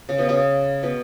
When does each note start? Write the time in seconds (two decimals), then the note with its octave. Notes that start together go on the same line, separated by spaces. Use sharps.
0.09 C#3
0.18 B2
0.29 C#3
0.83 B2